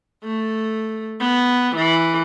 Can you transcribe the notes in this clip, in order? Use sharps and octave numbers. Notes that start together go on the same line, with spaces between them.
A3
B3
E3